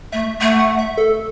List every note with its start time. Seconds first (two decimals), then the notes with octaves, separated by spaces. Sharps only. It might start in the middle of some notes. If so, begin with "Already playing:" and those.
0.12 A3 E5
0.41 A3 F#5
0.59 F#5
0.79 E5
0.98 A4